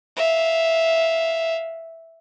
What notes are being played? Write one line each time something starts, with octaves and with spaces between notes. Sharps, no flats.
E5 F5